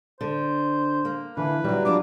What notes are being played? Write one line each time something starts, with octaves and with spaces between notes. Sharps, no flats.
D3 C5
A#3
D3 E3 B4
F#3 G3
F3 D4 F4 D6